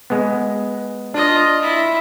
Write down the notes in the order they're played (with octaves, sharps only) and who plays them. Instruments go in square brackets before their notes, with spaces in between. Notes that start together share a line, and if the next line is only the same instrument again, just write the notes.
[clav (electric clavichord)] G#3 B3
[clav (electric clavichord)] D4 [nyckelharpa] F4 D#5
[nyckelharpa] E4